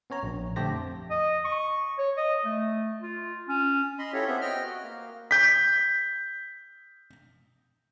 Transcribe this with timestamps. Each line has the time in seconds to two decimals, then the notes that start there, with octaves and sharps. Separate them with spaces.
0.10 B3 C#4 C#5 A#5
0.23 A#1
0.56 D3 A3 G4 C5 A5 A#6
0.71 F2
1.10 D#5
1.45 C#6
1.98 C#5
2.17 D#5
2.45 A3
3.02 F4
3.49 C#4
3.99 D#5 B5 C6
4.13 C#4 E4 F4 G4 A4 C#5
4.27 B3 C4 G#4 E5
4.41 D#5 G5 F6
4.64 F#4
4.83 A#3
5.31 G6 B6